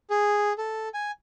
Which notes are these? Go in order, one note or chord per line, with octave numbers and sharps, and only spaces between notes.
G#4
A4
G#5